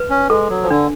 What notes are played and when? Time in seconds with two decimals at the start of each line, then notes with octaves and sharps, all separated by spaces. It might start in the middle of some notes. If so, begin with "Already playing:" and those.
Already playing: B4
0.10 C#4
0.30 G#3 A4
0.50 F#3
0.63 F3
0.70 D3 D4